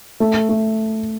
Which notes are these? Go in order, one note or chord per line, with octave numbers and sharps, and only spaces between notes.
A3
A3